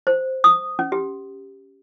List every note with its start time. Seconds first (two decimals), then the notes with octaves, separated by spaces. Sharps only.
0.07 C5
0.44 D#6
0.79 C#4
0.92 G4